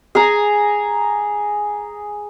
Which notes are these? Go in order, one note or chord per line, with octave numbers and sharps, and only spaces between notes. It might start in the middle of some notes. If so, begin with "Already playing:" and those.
G#4 G#5 A#5